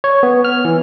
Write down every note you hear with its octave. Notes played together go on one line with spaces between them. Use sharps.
C#5
B3
F6
E3